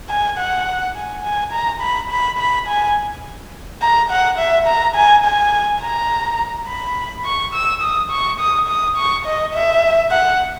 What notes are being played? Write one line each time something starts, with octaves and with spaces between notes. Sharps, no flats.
G#5
F#5
G#5
G#5
A#5
B5
B5
B5
G#5
A#5
F#5
E5
A#5
G#5
G#5
A#5
B5
C#6
E6
D#6
C#6
D#6
D#6
C#6
D#5
E5
F#5